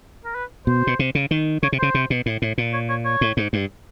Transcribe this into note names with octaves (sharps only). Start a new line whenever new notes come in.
A#4
B4
B2 C5
B2
C3
C#3
D#3
C#3 C#5
C3
C#3 C5
C3
B2
A2
A2
A#2
C#5
C#5
C#5
A2
G#2
G2